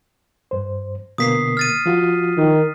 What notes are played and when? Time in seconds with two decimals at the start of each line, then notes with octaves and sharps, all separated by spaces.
0.51 G2 C5
1.18 B2 D3 A#3 D#6 B6 C7
1.57 F6 A6 D#7
1.86 F3 F4 F#4
2.38 D#3